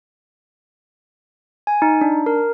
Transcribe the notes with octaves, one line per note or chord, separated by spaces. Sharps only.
G#5
D#4
D4
A#4